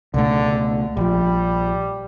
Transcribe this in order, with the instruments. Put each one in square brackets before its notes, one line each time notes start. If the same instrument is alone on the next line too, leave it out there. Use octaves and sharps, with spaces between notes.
[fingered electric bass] C#2 B2 A3 [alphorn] D3
[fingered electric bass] A#1 F3 [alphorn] G3